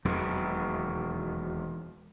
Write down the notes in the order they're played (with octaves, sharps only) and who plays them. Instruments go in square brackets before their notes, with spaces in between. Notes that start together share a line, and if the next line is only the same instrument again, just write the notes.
[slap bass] E1 D#2 B2 F#3